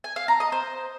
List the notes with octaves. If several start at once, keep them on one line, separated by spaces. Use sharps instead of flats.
G#5
F5
A#5
D#5
C5